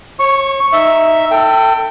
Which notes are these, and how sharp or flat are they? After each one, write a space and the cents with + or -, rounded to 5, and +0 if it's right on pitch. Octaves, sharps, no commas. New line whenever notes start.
C#5 -35 C#6 +0
D#4 +0 E5 +0
A4 +30 G5 -5